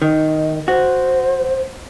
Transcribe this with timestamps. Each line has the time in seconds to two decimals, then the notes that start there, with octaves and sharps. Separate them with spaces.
0.02 D#3 D#5
0.68 F#4 C5